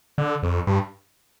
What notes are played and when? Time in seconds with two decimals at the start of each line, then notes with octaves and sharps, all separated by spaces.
0.18 D3
0.43 F2
0.67 G2